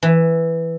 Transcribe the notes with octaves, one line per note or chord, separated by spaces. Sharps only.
E3